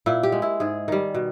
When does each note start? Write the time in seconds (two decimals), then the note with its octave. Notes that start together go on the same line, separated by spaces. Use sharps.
0.06 A#2 E4
0.23 G4
0.32 G#3
0.42 E4
0.60 G#2 G#4
0.88 D#3 G3
1.15 B2